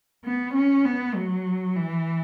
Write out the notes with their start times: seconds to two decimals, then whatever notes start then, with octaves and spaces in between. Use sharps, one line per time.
0.24 B3
0.54 C#4
0.85 B3
1.15 F#3
1.76 E3